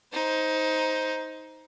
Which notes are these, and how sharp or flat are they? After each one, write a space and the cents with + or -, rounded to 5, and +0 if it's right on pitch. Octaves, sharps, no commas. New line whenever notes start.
D#4 +15 C5 +0